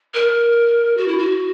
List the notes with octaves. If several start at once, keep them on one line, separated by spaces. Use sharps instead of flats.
A#4
F#4
E4
F#4